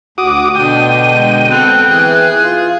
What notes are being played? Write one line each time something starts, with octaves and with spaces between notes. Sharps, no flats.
D2 F#4 D6 D#6
B2 D3 D4 G5 D#7
D3 G#3
B3 C4 A4 F#6
E3 G#4
F4